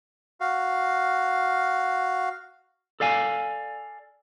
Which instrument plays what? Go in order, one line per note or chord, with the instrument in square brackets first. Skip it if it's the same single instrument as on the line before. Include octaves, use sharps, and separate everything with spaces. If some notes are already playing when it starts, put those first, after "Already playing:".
[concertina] F#4 F5
[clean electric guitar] A4 D5 F5 G#5